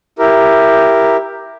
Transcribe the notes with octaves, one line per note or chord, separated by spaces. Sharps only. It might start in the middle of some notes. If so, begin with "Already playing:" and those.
E4 G4 A#4